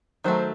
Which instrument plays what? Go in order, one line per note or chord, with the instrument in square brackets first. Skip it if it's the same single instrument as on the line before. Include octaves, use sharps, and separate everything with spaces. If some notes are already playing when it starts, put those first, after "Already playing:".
[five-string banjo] D#3 F#3 A3 [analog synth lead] C5